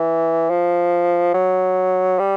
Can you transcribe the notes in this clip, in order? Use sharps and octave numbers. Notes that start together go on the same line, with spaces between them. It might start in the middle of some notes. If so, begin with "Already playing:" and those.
Already playing: E3
F3
F#3
G3